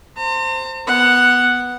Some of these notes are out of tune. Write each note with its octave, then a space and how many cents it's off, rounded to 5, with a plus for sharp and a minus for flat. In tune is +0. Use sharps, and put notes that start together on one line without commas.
C5 +0 A#5 -45
B3 +0 F#5 +0